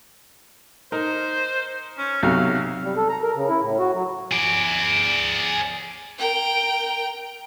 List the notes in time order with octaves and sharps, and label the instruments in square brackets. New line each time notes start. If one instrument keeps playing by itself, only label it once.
[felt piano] D#4 A#4 [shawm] C5
[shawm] C#4
[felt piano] B1 C3 F#3 [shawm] F5
[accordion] G3
A4
A#5
A#4
C#3
E4
A2
F#4
F#3
[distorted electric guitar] G#4 D5
[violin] A#4 G5